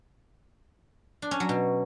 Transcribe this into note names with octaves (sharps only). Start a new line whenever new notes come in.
D4
C#4
F#3
B2